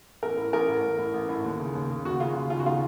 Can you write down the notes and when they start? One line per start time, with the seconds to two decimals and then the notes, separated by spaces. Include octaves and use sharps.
0.23 A1 A#4
0.37 A2
0.53 A1 A#4
0.68 A2
0.84 A1
0.99 A2
1.14 A1
1.29 A2
1.45 D#2
1.59 C#3
1.75 D#2
1.90 C#3
2.05 D#2 F#4
2.20 C#3 F4
2.36 D#2
2.50 C#3 F4
2.60 F#4
2.66 D#3 F4